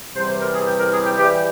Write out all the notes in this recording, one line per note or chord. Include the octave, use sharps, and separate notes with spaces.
E2 C3 E3 G3 C5
C5
A#4
G#4
G4
A#4
G#4
G4
E2 E3 G3 G4